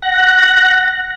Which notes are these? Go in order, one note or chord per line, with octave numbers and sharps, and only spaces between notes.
F#5 F#6 A#6